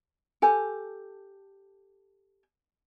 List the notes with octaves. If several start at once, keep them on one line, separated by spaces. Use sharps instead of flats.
G4 A4 G#5